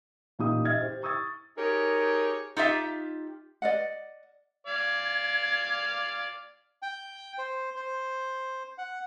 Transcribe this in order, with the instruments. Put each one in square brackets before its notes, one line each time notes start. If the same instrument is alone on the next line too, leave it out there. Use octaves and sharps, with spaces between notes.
[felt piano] A1 A#2 D#4 G4 D#6
D#5 E5 F6 G#6 A6
G4 C5
C#6 D#6 E6 G#6 A6
[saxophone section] D#4 G4 G#4 A#4 C#5
[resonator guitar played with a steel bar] D#4 F4 G4 E5
[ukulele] D5 D#5 F#5
[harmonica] D5 F5 [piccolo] G#6
[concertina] G5
C5
C5
F#5